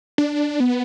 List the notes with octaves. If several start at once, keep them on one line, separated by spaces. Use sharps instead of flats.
D4
B3